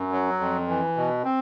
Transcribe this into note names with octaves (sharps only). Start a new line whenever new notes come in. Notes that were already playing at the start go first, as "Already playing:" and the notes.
Already playing: F#2
F#3
F2
E3
B2
C4